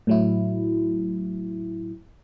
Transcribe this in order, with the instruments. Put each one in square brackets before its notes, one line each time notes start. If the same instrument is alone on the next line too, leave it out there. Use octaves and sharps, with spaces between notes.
[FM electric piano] A2 F#3 E4